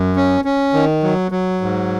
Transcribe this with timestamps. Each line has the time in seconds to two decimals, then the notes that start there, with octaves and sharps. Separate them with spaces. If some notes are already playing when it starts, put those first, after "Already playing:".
Already playing: F#2
0.16 C#4
0.45 C#4
0.74 D#3
1.03 F#3
1.31 F#3
1.61 G#2